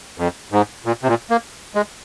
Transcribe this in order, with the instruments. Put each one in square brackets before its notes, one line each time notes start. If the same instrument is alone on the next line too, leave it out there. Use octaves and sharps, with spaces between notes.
[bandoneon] F2
G#2
A#2
C3
A#2
A#3
G#3